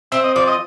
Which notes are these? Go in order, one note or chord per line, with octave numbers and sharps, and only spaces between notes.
C4 E5
D#5
F3 D5
D#5